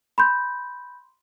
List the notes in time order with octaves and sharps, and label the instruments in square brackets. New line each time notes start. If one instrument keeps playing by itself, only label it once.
[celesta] B5 C6 G6